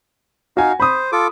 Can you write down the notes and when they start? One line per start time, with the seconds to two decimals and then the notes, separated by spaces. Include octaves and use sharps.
0.57 D#4 F#4 F5 G#5
0.80 C5 B5 D#6
1.12 F4 A4 D6